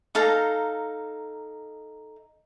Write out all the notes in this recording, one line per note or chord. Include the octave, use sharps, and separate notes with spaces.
D#4 A4 F5 A#5